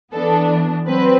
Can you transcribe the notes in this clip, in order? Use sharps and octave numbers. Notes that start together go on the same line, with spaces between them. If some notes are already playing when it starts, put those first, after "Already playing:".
E3 B3 D4 A4
F#3 C4 B4